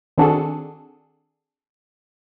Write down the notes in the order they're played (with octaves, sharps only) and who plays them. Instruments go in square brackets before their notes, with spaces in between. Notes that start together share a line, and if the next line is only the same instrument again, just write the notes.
[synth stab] D#3 C4 D4 F#4 G#4 A4